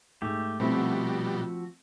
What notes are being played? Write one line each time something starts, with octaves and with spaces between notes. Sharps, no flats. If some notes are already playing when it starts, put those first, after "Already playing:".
G#2 A3 G4 G#4
B2 F3 G3 A3 C4 E4 F#4 E5